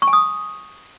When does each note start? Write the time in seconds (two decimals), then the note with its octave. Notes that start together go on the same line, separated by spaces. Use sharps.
0.02 C#6
0.07 G#5
0.13 D#6